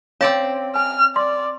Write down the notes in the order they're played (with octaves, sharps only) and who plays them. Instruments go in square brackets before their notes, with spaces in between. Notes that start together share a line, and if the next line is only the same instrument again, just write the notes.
[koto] C4 D5 A5 [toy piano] C#4 C#5 F5
[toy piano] G#5 [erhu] F6
[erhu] D5 [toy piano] C6